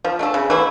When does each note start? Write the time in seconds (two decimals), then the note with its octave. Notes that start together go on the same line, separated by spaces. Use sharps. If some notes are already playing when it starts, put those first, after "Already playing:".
0.04 F3
0.19 A3 D4 A4
0.34 C#3
0.50 E3 A3 E4